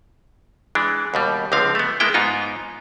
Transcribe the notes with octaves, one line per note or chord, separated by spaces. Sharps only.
E3 G#3 D4
D#2 B2 G3
C#2 D3 F3 C4 F5
A3 B3
G#3 A#3 B3 E4 G5
G#2 B3 D#4 F4